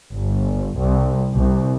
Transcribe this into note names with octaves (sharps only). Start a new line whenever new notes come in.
G1
C2
C2